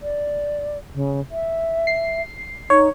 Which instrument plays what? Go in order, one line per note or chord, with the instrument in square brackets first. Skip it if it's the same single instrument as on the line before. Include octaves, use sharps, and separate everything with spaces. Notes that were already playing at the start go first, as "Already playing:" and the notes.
[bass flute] D5
C#3
E5
[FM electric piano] C7
[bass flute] D#4 [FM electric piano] C#5